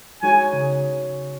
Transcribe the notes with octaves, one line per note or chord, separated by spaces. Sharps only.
G#3 D#4 F#4 C#5 G#5
C#3